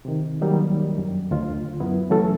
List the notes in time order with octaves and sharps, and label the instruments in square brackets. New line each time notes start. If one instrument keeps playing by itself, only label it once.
[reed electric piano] C3 D#3
D#3 F#3 G3 A#3 D#4
F#2
D2 F4
F#2 B3 E4
C#3 E3 F#3 A3 C#4 A4